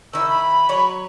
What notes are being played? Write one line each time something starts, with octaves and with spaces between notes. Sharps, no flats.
D#3 E4 E6
B5
F#3 C#5